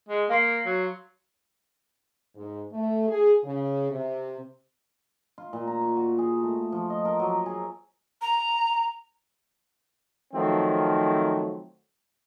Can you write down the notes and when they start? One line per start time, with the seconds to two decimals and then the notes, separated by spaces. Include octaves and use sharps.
0.09 G#3
0.29 A#3 F5 C6 C7
0.66 F#3
2.36 G#2
2.72 A3
3.08 G#4
3.42 C#3
3.91 C3
5.38 F4
5.53 A#2
5.67 A#5
5.81 C#6
5.96 F#4
6.19 G#4
6.43 A3
6.72 F3
6.90 D#5
7.05 A#4
7.20 F#3
7.46 G#4
8.22 A#5
10.34 D#3 F3 F#3 A3 C4